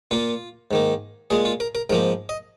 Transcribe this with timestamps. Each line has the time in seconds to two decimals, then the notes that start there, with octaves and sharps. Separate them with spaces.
0.11 A#2 A#3 F4
0.71 G#2 D#3 A#3
1.30 A#2 G#3 G#4
1.45 F4
1.60 A#4
1.75 A#4
1.90 G#2 A#4
1.92 F3 A#3
2.29 D#5